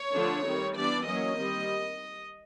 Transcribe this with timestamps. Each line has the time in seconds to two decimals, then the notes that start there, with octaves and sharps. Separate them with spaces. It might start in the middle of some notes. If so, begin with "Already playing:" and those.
Already playing: C#5
0.13 D3 F3 A3 D4
0.44 D#3 G3 C4
0.75 E3 G3 B3 D4 D5
1.06 F#3 A#3 C#4 D#5
1.36 D#3 G3 C4